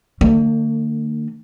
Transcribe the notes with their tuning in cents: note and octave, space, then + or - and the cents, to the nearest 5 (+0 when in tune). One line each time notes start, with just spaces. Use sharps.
D3 +40 A#3 -45